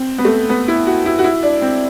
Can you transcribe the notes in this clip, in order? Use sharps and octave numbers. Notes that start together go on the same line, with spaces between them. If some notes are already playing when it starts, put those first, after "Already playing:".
Already playing: C4
B3
A3
B3
E4
F#4
E4
F#4
E4
D4
C4